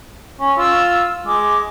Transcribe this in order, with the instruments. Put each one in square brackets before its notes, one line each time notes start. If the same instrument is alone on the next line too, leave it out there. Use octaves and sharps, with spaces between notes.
[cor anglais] C#4
[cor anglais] F4 [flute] E6
[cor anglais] G#3 [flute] D6